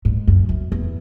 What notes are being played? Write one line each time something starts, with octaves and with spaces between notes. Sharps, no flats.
G#2
F#2
F#2
E2